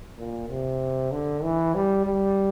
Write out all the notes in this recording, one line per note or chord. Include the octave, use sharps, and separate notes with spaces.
A#2
C3
D3
E3
G3
G3